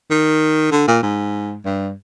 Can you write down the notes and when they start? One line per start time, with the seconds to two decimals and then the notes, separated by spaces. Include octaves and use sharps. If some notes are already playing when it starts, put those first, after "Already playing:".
0.10 D#3
0.71 D3
0.87 A#2
1.03 G#2
1.65 G2